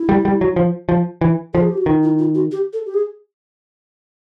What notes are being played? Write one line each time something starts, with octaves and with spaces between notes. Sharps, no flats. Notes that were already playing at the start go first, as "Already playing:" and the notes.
Already playing: E4
G3
G3
F#3
F3
F3
E3
F3 A4
G#4
G4
F#4
D#3 F4
E4
F4
F#4
G4
A4
G4
G#4